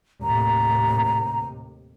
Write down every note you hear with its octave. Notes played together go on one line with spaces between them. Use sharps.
D#2 A2 C3 A#5